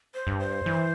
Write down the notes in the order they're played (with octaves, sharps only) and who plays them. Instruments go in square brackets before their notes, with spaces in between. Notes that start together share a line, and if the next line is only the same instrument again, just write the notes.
[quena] C5
[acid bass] G2
[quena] C5
[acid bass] E3